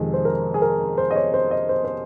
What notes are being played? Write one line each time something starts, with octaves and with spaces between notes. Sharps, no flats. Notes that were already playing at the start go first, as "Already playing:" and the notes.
Already playing: F2 C3 D#3 G#3 G#4
C5
A#4
G#4
A#4
C5
D#5
C#5
C5
D#5
C5
C5